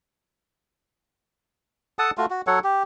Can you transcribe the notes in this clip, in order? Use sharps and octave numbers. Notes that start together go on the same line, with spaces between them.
A4 F#5 A5 D#6
A3 F4 F#4
F#4
F#3 A4 C#5 F#5
G4